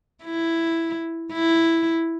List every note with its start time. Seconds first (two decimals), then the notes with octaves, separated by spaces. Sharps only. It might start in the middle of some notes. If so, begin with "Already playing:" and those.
0.24 E4
1.33 E4